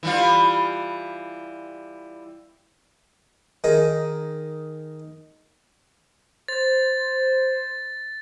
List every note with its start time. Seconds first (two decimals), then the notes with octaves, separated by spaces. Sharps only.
0.03 E3 G3 F4
3.64 D#3 D#4 G#4 A#4
6.48 C5 A6